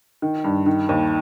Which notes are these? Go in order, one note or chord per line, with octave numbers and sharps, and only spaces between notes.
D#3
G2
D#3
D#2